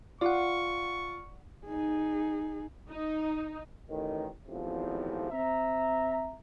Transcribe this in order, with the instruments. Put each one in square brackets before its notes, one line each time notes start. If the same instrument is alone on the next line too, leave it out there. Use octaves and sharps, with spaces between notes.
[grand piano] F4 [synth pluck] D5 F#5 [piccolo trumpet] C#6
[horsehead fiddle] D#4 G#4
[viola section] D#4
[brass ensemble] A1 D#3
G#1 E2 A2 C3 F3
C4 E5 A#5